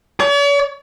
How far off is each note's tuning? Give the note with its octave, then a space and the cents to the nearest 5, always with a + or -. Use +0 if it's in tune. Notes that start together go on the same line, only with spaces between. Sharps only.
C#5 +45